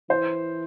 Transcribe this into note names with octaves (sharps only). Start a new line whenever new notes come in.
E3 C5